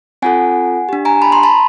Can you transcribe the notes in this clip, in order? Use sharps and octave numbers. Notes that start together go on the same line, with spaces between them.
C4 F4 A4 F#5 G#5
D4 G4
G#5 A#5
A5 B5
A#5 C6
A5 B5